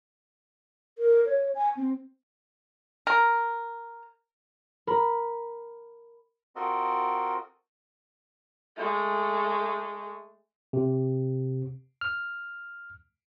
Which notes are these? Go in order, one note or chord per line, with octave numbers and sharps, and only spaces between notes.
A#4
C#5
G#5
C4
A#4
A#4 B5
C4 F4 F#4 A4 A#4 D#5
G#3 A3
C3
F6